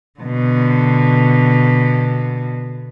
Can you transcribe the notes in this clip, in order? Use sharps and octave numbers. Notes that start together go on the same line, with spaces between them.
B2 D3